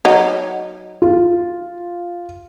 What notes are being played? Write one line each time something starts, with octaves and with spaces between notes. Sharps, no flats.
F#3 D#4
F4